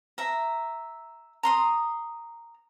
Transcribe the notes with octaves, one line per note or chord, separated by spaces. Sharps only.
E5 A#5
A#5 C6 D#6